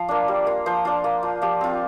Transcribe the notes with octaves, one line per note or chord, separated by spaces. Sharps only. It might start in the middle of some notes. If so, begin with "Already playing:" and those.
Already playing: F3 F4 F5
A#3 D4
G3
A#3 F4
F3 C5
D4 F4
A#3
F4
F3 G4
C4 F4